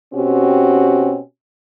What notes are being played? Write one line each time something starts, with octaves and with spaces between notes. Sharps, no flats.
B2 C4 C#4 F#4 G4